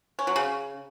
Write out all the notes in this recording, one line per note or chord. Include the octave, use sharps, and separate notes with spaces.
C#4
F#3
C#3